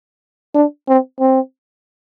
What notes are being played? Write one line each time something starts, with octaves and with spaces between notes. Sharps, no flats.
D4
C4
C4